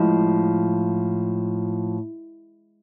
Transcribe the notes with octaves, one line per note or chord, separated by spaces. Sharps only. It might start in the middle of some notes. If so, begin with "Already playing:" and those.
Already playing: A2 F3 G#3